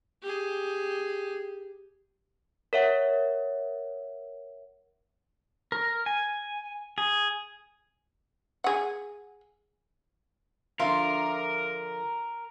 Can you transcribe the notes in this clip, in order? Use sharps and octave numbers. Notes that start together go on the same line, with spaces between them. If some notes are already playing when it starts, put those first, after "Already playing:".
G4 G#4
A#4 C#5 E5 F#5
A#4
G#5
G#4
G#4 F#5
D3 F3 F4 A#4 E5 C6